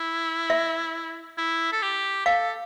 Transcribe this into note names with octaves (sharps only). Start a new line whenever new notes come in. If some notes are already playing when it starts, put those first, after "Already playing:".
Already playing: E4
E5
E4
A4
G4
A4 F5